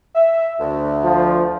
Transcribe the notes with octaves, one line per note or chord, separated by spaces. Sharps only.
E5
D2
F3